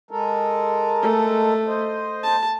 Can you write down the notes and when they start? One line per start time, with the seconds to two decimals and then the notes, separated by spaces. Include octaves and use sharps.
0.11 G#3 A4 A#4
1.02 A3
1.67 C5 D#5
2.23 A5